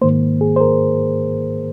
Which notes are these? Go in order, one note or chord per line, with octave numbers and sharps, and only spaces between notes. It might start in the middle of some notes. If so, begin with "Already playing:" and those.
G#2 D#3 A#3 C5
G#4
C5
A#4